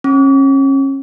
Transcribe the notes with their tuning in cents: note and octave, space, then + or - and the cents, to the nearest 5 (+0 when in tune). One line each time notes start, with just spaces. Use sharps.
C#4 -30 D6 -45